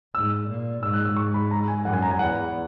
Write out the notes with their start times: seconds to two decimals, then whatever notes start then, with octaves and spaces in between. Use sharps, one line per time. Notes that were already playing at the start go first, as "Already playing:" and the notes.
0.15 G#2 E6
0.49 A#2
0.82 G#2 E6
0.94 F#6
1.05 E6
1.17 C#6
1.34 B5
1.51 A#5
1.68 G#5
1.85 F#2 F#5
1.93 G#5
2.02 A#5
2.11 G#5
2.19 E2 F#5